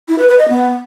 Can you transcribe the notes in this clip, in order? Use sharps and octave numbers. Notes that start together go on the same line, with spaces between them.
E4
B4
B4
D#5
B3